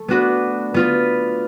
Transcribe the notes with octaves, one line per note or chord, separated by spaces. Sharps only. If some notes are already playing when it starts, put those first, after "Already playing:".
Already playing: A3
B3 D4 F#4 B4
B3 F4 B4